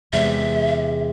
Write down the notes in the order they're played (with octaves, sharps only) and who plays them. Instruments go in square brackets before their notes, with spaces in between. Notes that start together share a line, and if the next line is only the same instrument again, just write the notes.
[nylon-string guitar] E2 C3 G#3 [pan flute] E5